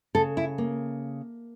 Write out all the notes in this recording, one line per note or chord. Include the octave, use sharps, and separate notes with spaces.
C#3 A4
E4
A#3